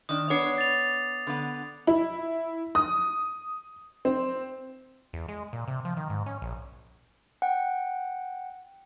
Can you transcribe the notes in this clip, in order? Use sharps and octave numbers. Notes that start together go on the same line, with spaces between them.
D#3 D4 D#6
B3 D4 C#5 D6 C7
A6 F7
D3 B3
E4
D#6
C4
E2
G#3
A#2
C3
F3
D#3
G#2
C#4
A#1
F#5 G5